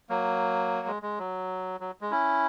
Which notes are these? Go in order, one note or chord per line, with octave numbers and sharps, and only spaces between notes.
F#3 A#3
G#3
G#3
F#3
F#3
G#3
C#4 E4